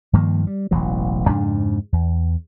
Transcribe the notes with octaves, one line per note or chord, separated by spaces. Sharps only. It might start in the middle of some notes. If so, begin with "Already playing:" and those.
G2 D#3 F3 A#3
G3
E1 A1 E3 F#3
F2 G#2 C#3 D4
E2